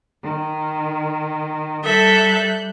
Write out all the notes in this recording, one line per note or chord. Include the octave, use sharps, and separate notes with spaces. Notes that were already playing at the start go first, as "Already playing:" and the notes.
D#3
G3 A4 E5 F#6 G6